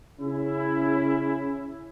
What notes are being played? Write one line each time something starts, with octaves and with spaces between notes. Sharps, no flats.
C#3 C#4 E4